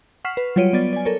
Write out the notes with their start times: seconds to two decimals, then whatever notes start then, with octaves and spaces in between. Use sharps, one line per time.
0.25 F#5 C#6 F6 B6 C7 E7
0.37 B4
0.56 F#3 G3 F4 C#5 D7 D#7
0.73 B3 D5 A6
0.93 D5 G#5
1.05 A4 A#4 C#5